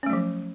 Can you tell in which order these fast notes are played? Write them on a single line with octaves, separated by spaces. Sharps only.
C#4 A3 F#3 F3